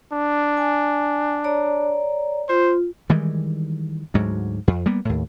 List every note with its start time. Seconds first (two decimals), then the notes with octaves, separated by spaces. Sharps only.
0.13 D4
0.57 G#5
1.44 C#5 D5 A#5
2.49 F4 C5
3.09 D#3 E3 G3 G#3
4.14 D2 G#2 F#3
4.68 F2
4.86 G3 A#3 B3
5.05 D#2 A2